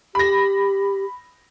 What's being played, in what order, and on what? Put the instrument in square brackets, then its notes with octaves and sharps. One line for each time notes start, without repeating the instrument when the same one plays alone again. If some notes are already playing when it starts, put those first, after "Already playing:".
[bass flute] G4 [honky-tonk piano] B5 A#6